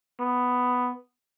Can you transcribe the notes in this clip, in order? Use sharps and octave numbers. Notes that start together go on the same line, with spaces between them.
B3